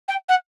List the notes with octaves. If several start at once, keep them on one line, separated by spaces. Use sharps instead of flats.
G5
F#5